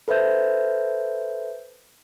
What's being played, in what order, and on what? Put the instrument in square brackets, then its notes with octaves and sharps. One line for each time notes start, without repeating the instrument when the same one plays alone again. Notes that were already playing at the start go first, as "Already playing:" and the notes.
[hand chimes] A4 B4 C5 E5 G6